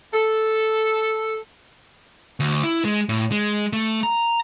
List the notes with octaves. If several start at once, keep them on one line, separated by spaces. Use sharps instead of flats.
A4
D2
E4
G#3
A2
G#3
A3
A#5